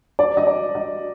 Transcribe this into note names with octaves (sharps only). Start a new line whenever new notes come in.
D5
D#5
D5
D#5